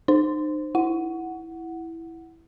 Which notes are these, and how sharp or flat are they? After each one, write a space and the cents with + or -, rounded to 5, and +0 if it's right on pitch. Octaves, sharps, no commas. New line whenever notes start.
D#4 -35 C5 +0
E4 +0 F#5 +0